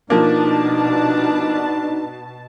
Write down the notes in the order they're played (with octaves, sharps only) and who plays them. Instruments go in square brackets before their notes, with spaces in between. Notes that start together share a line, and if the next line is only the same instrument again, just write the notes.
[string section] B2 A5 [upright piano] F3 A#3 [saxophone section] D4 [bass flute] D#4